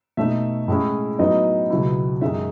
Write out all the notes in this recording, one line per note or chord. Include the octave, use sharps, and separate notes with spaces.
B2 A3 D#4 E5
A2 G#3 C#4 E4
A2 F#3 B3 D#4 D#5
C#2 B2 F#3 B3 E4
F#2 D#3 G#3 D#4 E5